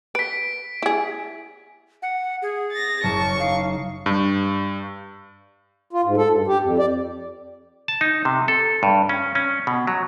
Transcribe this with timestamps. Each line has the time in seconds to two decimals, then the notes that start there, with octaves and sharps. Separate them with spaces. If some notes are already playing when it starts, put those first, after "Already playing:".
0.15 B4 B6 D7
0.82 E4 G#4
2.02 F#5
2.42 G#4
2.72 A6 A#6
3.03 F#1 A5 C#6
3.40 D#4 F5
4.06 G2
5.93 F4
6.05 G#2
6.17 A4
6.29 G2
6.48 G4
6.62 F2
6.78 D5
7.88 A5
8.01 D#4
8.25 C3
8.48 A4
8.83 G2
9.09 C#4
9.35 C#4
9.67 B2
9.87 F#3